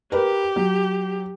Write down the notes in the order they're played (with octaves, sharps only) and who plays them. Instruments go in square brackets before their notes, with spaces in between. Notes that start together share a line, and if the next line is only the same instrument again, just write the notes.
[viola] G4 [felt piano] A#4 B4
[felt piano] F#3